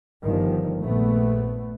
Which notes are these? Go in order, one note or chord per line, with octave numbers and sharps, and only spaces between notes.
G1 D#3 F3
A#1 A3 B3